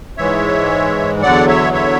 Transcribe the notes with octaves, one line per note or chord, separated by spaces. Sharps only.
G#2 E3 G#3 C#5 E5
E2 D3 F#3 D5 F#5
C#5 E5
C#5 E5